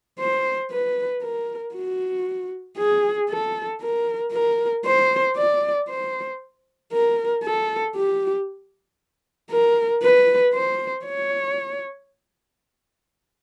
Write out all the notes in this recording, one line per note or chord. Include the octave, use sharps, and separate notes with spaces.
C5
B4
A#4
F#4
G#4
A4
A#4
A#4
C5
D5
C5
A#4
A4
G4
A#4
B4
C5
C#5